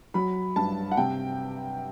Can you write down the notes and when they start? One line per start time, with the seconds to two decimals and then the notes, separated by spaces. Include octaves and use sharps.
0.14 F#3 B5
0.56 G2 A5
0.92 F#5
0.97 C3 G5